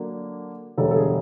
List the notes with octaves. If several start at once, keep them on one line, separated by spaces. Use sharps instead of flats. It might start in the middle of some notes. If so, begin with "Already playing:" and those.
Already playing: D3 F#3 A#3
E1 D2 D3 G3 A4
A4
G#4